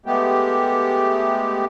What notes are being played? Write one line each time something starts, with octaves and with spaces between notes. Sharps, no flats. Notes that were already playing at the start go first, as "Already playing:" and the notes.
G#3 A3 B3 G4